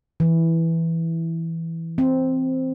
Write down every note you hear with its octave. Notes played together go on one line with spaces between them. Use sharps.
E3
C4